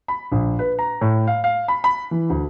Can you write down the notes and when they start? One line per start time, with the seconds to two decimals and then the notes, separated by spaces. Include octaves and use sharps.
0.08 B5
0.32 A#1
0.59 B4
0.79 A#5
1.01 A2
1.27 F5
1.44 F5
1.68 B5
1.84 B5
2.11 E3
2.30 D2